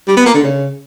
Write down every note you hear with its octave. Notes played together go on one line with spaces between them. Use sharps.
G3
B3
A#3
D3
C#3